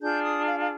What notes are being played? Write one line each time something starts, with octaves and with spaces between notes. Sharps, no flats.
D4 F4 G#4 G6
D#6
F5
F5